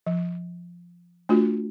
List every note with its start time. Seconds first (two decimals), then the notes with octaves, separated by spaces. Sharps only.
0.07 F3
1.29 A3 D4 F4 F#4